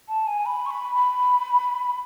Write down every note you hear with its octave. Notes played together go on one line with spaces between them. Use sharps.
A5
G#5
B5
C#6
B5
B5